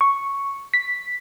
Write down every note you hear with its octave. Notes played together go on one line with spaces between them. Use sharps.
C#6
B6